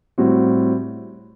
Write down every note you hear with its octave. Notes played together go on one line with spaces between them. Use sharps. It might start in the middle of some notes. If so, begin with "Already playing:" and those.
A2 G3 C4 F#4